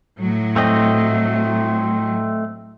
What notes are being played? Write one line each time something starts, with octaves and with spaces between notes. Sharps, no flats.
A2 F#3
A3 C4 D#5